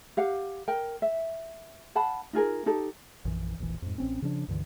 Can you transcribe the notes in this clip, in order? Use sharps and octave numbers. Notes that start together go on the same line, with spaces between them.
G4 F5 F#5
A#4 G5
E5
F5 F#5 A5 B5
D#4 F4 G#4 A#4
D#4 G4 A4
A#1 F#2 E3
E1 A#1 E3
F2 G#2
A1 C4 C#4
C#3 F3 D4
C#2 G2 D3 E3